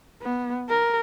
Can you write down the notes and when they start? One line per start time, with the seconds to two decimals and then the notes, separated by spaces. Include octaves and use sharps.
0.22 B3
0.69 A#4